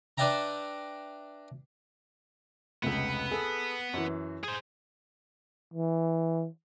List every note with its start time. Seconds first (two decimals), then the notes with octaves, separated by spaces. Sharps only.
0.18 D4 B4 D5 E5 G5 A#5
2.83 F1 C#2 B3
3.31 G#4 A4
3.94 F#2 E3
4.44 G#4 C5
5.74 E3